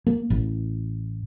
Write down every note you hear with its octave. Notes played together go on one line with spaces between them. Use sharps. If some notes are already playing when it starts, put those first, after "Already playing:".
A#3
A1